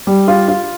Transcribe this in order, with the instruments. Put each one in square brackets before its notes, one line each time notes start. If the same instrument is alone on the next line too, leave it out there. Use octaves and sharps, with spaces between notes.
[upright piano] G3
F4
F4